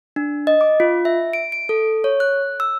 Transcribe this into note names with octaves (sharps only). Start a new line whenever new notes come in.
D4
D#5
D6
F4
E5
D7
D7
A4
C#5
F#6
E6